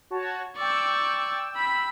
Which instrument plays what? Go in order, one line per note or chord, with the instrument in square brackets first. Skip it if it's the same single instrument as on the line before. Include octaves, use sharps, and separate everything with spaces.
[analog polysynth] F#4 C#5 A5
[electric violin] D5 C#6 [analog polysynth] G5 E6
[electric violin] B5 B6